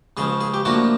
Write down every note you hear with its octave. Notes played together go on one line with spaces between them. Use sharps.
C#2 C#3 F3 G#4
G#4
G4
A2 F3 A#3 D4 F#4